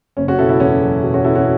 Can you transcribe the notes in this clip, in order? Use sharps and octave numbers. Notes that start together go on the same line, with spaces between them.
F#1 C#4
C#4 F#4
B2 E4 A4
E4 A4
E2 C#4 F#4
F#3
B2
C#4 F#4
B2 E4 A4
C#4 F#4